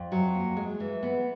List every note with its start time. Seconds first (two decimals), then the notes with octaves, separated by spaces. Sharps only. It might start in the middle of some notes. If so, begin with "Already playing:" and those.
Already playing: F2
0.12 F#3
0.35 A#3
0.57 G#3
0.80 E3
1.03 B3